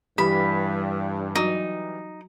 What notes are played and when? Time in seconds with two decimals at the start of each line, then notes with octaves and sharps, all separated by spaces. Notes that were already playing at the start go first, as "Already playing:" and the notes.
0.18 G2 E3 G3 G4 B5
1.35 F#3 D#4 F#4